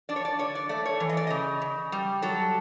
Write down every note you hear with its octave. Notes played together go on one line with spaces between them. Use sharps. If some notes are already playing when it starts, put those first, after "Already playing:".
D4 D5
C#5
D5
D3 C#5
D5
A3 D5
C#5
E3
D#5
D5
C#3 D#5
C#3
G3
F#3 A4